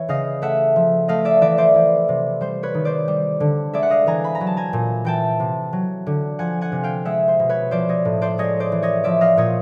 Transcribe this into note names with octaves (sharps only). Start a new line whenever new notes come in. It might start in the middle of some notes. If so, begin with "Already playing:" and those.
Already playing: E3 C#5
C#3 D#5 F5
A3 E5 F#5
F3
A3 D#5 F5
D5 E5
E3 D5 E5
C5 D5
E3
C3
G3 C5
B4 C#5
D#3
C5 D5
G3
D3
G#3 D5 E5
F#5
D#5 F5
E3 G#5 A#5
B5
A#5
F#3
A5
G#5 A#5
A#2
E3 G5 A5
C3
F#3
D3
F3 F#5 G#5
F#5 G#5
C3
F5 G5
G#3 E5 F#5
C5
B2
B4 C#5
F3 C5 D5
C#5 D#5
A2
C5 D5
G#3 C#5 D#5
C5 D5
E3
C#5 D#5
F3 D5 E5
D#5 F5
A#2 C#5 D#5